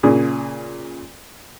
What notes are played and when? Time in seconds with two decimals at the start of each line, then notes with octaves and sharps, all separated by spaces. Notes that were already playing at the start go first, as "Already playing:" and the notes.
0.03 A#2 C#3 G#4